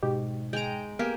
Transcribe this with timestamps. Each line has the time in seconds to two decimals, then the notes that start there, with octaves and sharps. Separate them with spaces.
0.03 G#2 B2 G4
0.53 G#3 G5 A#5 D7
0.99 A#3 B3 G4 G#4 A#4